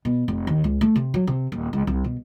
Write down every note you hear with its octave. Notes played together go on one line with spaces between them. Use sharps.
B2
F1
D#2
C#2
A3
C3
F#3
C3
D#1
C#2
C2
B2